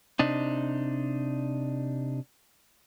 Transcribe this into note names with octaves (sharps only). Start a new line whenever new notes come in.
C3 D4 D#4